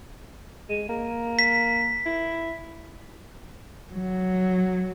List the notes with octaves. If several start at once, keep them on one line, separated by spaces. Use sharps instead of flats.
G#3
A#3
B6
E4
F#3